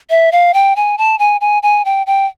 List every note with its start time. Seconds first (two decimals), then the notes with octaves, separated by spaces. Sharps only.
0.10 E5
0.32 F5
0.54 G5
0.76 G#5
0.98 A5
1.19 G#5
1.41 G#5
1.63 G#5
1.85 G5
2.07 G5